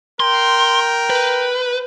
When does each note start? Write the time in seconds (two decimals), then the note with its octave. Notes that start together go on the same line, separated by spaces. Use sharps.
0.20 A#4 G5 C6
1.10 B4